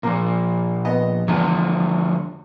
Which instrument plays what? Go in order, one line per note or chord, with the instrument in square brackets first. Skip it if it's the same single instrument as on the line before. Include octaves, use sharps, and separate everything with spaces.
[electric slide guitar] A#2 F3 [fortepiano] A#3
[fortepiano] B3 D#5
[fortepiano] E2 [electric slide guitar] D3 F3 A3